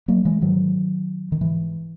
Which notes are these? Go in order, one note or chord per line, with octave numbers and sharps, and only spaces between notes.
F#3 A#3
E3 G#3
G#2 D#3 F#3
D#3
G#2 E3